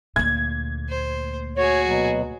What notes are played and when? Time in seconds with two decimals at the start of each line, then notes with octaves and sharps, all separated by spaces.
0.16 D2 A#2 G#6
0.89 C5
1.57 F#4 G#4 C#5
1.87 B2 F#3